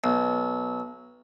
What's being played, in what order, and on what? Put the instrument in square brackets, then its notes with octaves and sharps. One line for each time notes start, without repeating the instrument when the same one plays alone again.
[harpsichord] B1